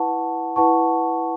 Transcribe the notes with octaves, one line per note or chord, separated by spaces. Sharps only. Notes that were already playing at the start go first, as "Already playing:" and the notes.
Already playing: E4 B4 F#5 A5 C#6
E4 B4 F#5 A5 C#6